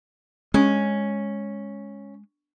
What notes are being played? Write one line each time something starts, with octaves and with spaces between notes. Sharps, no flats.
G#3 C#4